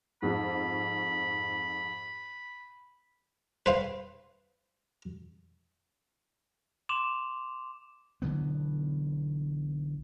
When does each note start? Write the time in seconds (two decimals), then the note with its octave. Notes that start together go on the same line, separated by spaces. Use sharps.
0.22 F2 G#2 B5
3.66 B4 C5 F5
6.89 C6 D6 E7 F7
8.22 B1 D3 E3 B3